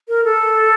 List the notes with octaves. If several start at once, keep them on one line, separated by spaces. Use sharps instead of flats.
A#4
A4